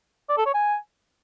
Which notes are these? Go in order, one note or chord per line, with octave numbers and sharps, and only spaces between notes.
D5
A4
C#5
G#5